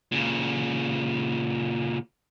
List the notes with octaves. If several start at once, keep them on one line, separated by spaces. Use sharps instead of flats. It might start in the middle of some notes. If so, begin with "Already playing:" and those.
A#2 C#3